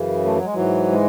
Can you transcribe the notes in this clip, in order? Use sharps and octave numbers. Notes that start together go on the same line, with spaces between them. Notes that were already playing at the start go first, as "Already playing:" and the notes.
Already playing: F#2 C#3 E3
A3
F#3
G#3
G#2 E3 F#3
G#3